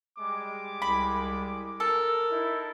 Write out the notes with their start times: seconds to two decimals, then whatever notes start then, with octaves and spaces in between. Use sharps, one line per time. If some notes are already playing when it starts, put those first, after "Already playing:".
0.19 G3 G#3 D6
0.82 C2 B5
1.80 A4 A#4
2.31 D#4 E4